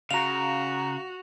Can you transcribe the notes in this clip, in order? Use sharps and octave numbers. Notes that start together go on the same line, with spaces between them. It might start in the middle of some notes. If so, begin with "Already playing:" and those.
C#3 F#4 F5 A#5 F7